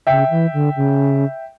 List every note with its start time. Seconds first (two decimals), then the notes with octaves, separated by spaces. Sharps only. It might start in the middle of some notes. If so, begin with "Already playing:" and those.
0.07 C#3 E5 G5
0.30 E3
0.53 D3
0.76 C#3